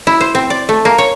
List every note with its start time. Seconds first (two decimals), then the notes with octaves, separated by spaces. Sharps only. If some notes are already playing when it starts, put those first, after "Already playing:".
0.07 E4
0.21 C5
0.35 C4
0.50 D5
0.69 A3
0.85 A#3
0.98 C#5